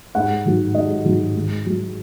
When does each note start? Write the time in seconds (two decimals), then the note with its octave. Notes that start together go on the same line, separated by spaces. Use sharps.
0.15 G#2 F#5
0.45 D#3 F#3
0.74 G#2 D#5
1.05 D#3 F#3
1.35 G#2
1.66 F#3